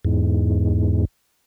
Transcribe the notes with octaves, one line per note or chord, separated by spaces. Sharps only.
E2 G#2